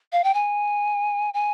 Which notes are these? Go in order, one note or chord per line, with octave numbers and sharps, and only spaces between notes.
F5
G5
G#5
G#5